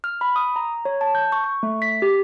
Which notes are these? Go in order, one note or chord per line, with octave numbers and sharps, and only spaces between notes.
F6
B5
D#6
A#5
C#5
A5
G6
C#6
C#6
A3
B6
G4